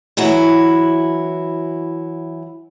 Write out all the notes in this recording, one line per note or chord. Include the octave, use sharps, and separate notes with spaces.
E3 F#3 E4 F#4